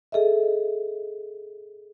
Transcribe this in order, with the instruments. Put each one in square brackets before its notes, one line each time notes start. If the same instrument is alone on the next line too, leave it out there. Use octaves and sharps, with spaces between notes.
[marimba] G#4 A4 D#5 E5